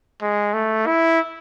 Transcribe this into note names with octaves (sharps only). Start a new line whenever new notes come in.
G#3
A3
E4